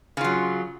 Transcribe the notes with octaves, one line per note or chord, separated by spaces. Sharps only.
C#3 F#3 F4